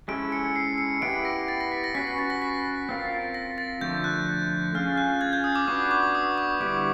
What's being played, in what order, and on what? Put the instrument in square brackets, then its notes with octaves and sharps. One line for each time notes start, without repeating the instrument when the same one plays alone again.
[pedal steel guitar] G#3 C#4 E4 A4 C5 [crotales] D7
[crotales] C#7
C7
C#7
[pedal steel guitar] B3 E4 G4 [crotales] D7
[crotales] A#6
A6
A#6
B6
A#6
[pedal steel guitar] C#4 F#4 B4 [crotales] B6
[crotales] A#6
A6
A#6
B6
[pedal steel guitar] C4 F4 A#4
[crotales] A#6
A6
[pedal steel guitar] D3 F3 A3 [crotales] G6
[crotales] F#6
[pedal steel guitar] C#4 F4 G#4 [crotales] F6
[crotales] F#6
G#6
G6
D#6
D6
[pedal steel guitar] B3 D4 F#4 B4 [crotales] C#6
[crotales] D6
D#6
C#6
[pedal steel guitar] D3 G3 B3 E4 [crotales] D6